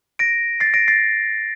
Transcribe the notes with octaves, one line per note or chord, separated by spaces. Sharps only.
A#6 D7
A6 C7
A#6 D7
A6 C7